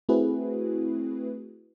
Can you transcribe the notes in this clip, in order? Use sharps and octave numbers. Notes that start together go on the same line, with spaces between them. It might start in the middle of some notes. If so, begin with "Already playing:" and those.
A3 C4 E4 F#4 G#4 B4